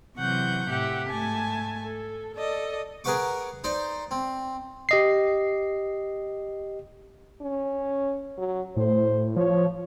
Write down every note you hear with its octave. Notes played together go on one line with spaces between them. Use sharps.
C3 E3 F#3 F#5 C#6 G6
A2 C3 G4 E5 F#5
G#2 A3 G#5 A5
A4
A4 D5 D#5
G#4 A#4 B4 F#5 C#6 D6
D#4 C5 D5
C4
G4 D#5 C7
C#4
F#3
A2 C5
F3 C#5